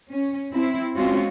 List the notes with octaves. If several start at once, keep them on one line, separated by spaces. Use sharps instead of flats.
C#4
C4 E4
G#3 C4 C#4 F4 F#4